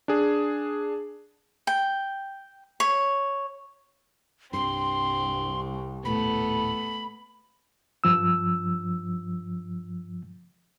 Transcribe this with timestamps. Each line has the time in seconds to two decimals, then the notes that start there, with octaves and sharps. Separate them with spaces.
0.08 D4 G#4
1.67 G5
2.80 C#5
4.53 C2 G2 C4 C6
6.05 D#1 A2 A3 B3 A4 B5
8.04 G2 F3 E6